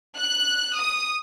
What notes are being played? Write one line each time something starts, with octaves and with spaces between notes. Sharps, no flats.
F#6
D#6